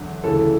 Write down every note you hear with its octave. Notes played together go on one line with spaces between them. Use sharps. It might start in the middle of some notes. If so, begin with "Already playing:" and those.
Already playing: E2 D3 F#3
D2 C#3 E3 A4